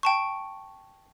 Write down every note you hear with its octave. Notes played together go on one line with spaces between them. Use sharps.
G5 A5 C#6